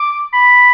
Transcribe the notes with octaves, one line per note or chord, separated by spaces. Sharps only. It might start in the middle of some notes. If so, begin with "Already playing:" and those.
Already playing: D6
B5